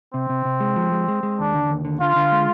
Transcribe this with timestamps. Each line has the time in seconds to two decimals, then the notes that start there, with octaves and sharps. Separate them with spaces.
0.14 C3 C4
0.30 C3
0.45 C3
0.60 G#3
0.76 F3
0.92 G#3
1.08 G#3
1.23 G#3
1.39 D#2 D4
1.55 D3
1.70 D#2
1.85 D3
2.01 D3 F4
2.16 D3
2.32 G#3